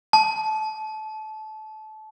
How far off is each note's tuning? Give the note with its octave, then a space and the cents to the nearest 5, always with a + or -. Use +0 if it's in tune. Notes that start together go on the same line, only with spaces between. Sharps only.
A5 -25